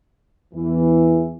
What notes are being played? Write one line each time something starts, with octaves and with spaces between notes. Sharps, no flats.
E2 E3